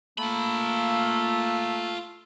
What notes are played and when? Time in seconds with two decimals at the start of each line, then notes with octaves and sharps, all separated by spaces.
0.18 A3 A#3 F4 B5